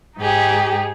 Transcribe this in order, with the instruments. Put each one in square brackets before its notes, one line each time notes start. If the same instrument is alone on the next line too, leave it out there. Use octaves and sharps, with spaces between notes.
[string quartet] G#2 D#4 G4 G#4